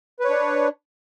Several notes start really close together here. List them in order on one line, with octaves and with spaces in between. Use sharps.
B4 C#5 D4